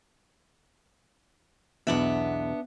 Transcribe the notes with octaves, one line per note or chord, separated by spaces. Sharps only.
B1 E2 B2 B3 D4 E5